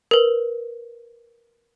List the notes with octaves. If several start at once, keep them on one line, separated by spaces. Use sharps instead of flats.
A#4 B4